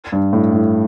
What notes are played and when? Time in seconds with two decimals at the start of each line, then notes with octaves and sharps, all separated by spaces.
0.12 G2
0.33 A2
0.53 A2